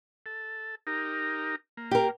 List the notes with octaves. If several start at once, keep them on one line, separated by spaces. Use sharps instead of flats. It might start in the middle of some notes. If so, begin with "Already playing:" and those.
A4
D#4 G4 A#4
A#3
G4 A#4